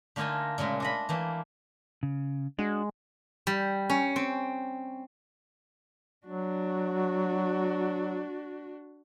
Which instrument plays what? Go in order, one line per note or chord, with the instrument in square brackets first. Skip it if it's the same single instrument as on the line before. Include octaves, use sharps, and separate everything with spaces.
[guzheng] D3 A3 A#3 D#4 F4 G#5
A#2 C#3 G#3 A3
D4 D#5 B5
E3 A3 A#3
[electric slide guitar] C#3
[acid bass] G#3 [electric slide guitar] D4 F#4
[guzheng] G3
C#4
C4
[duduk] F#3 [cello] D4 F#4